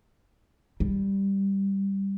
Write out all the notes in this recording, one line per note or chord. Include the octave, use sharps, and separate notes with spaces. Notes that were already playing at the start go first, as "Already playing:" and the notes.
G3